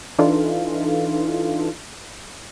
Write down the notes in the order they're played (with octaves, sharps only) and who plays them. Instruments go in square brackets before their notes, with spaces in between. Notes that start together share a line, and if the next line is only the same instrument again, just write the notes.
[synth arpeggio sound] E3 D4 D#4 F4 A4